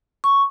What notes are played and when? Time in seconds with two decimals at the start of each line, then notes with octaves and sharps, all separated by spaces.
0.24 C#6